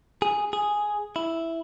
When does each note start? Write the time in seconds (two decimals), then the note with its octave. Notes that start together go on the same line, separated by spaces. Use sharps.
0.22 G#4
0.53 G#4
1.16 E4